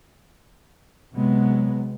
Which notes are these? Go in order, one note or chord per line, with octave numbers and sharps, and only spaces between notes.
C3 F#3 G#3 B3